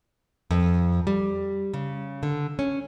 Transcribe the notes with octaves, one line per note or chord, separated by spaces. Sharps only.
F2
G3
C#3
D3
C#4